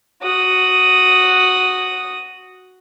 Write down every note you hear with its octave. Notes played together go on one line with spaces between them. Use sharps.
F#4 D#6